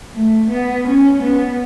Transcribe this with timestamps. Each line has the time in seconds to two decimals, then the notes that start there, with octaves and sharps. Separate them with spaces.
0.15 A3
0.50 B3
0.87 C#4
1.23 B3